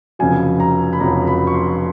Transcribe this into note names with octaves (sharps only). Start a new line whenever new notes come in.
F1 F2 C#3 F#3 G#5
A#5
B5
F1 F2 C#3 F#3 A#5
B5
C#6
C6